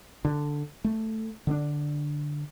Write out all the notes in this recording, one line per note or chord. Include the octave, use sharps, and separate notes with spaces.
D3
A3
D3 C4 D4